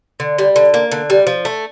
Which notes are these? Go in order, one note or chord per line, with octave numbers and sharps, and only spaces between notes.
D3
G3
D3
A#3
D3
G3
F3
A3